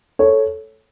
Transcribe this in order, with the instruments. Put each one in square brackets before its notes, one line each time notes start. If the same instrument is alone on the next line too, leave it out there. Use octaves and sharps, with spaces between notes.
[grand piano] A4 C#5